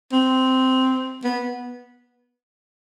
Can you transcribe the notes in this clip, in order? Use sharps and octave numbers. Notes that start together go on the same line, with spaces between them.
C4
B3